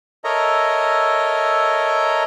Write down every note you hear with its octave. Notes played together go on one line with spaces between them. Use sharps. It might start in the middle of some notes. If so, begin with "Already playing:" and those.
A4 A#4 C#5 D#5 E5 A#5